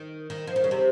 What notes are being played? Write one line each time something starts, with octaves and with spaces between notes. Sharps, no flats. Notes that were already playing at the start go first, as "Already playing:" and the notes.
Already playing: D#3
D#3
F3
D#3
C#3
C3